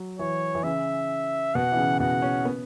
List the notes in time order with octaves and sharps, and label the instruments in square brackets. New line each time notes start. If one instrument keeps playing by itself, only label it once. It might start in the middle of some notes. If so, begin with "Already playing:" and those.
Already playing: [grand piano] F#3
[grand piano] E3 [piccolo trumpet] C#5
[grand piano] E3
[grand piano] C#3 [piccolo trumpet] E5
[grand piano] B2 [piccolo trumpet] F#5
[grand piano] E3
C#3
[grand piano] B2 [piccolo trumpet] F#5
[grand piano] C#4
B3